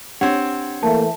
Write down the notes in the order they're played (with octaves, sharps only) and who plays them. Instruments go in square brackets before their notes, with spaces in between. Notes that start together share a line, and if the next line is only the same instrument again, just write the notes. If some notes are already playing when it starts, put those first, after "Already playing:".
[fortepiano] C4 C#5 [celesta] D4 G4 F#5
[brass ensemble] E3 A3 [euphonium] A#3 [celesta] A5